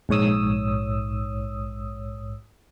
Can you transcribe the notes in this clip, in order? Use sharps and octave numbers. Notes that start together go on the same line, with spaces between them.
A#1 G#2 C#5 D#6 E6